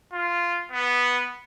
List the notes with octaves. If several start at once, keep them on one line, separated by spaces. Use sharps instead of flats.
F4
B3